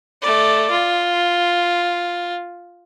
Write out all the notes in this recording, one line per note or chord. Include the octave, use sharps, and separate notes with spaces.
A3 D5
F4